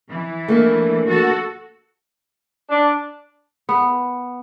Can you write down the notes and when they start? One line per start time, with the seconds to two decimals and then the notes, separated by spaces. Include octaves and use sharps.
0.10 E3
0.48 A3 A#3 D4
1.09 F#4 A4
2.70 D4
3.69 B3